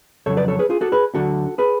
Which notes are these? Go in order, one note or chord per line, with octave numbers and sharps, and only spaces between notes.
F2 C#3 F#3 A4 C#5
B4 D5
A4 C#5
G#4 B4
F4 G#4
F#4 A4
G#4 B4
D2 D3 F#3 F#4 A4
G#4 B4